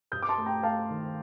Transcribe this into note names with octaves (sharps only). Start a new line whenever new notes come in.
G2 D#6 G6
D6
A5 C6
A3
G5 A#5
A3 F5 A5
D#3